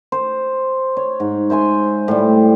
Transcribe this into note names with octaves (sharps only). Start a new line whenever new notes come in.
C5
C#5
G#2
C5 E5 G#5 C6
A2 G3